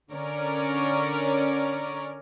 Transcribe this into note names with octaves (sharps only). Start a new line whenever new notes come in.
D3 C#4 A#4 C#5 D5